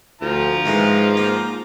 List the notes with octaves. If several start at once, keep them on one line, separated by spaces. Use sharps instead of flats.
D2 F3 F4 A#5
G#2 D#3 E3 G#3
A#3